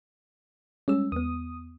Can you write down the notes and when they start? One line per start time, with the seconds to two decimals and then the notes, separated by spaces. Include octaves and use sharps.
0.88 G3 G#3 C#4 E6
1.12 E2 B3 D#6